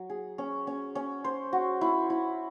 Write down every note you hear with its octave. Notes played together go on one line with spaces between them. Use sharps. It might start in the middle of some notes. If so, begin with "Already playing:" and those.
Already playing: F#3
G#4
C#4
C#4
C#4
C5
F#4
E4
E4